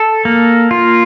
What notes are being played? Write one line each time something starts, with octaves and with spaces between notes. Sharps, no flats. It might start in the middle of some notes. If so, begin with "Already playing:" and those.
Already playing: A4
A#3
F4